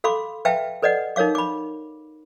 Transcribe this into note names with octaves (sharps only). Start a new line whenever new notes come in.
A4 F5 B5 C6 D6
B4 E5 F5 G5 A5
A4 B4 D5 D#5 F#5
D#4 A#4 C#5 F5 D6
B5 D6